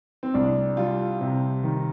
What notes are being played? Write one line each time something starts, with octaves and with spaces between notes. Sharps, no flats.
C4
C2 D4
G3 F4
C3
D#3